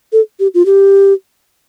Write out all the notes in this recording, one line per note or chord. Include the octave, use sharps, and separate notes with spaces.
A4
G4
F4
G4